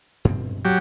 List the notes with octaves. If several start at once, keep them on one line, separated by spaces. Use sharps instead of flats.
G2 B2 C4
F#3 G4